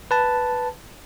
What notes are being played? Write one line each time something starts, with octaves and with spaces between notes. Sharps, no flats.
B4 A5